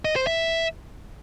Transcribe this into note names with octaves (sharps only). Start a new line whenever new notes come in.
D#5
C5
E5